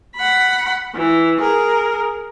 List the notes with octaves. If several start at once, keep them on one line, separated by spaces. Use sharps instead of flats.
F#5 B5
E3
G#4 A#4